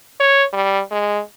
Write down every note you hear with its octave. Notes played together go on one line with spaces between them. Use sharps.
C#5
G3
G#3